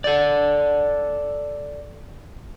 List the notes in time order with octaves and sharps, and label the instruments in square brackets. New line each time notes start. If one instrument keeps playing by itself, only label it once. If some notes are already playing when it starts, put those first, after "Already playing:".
[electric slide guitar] A4 D5